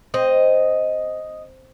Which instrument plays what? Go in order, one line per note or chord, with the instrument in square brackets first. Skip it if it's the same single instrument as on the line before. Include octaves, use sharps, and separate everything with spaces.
[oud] C4 [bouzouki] D#5